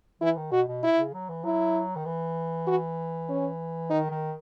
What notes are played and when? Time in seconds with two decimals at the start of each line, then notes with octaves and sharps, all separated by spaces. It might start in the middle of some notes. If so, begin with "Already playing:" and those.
0.21 E3 E4
0.37 D#3
0.52 B2 F#4
0.68 B2
0.83 E4
0.98 C#3
1.14 F#3
1.29 E3
1.44 F#3 E4
1.96 D#3
2.05 E3
2.67 F#4
3.29 C#4
3.90 D#3 D#4
4.11 D#3